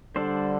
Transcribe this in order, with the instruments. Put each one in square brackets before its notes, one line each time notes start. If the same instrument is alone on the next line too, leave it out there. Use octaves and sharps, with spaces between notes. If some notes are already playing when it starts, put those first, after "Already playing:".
[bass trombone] D3 [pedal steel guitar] G3 D4 A4 C5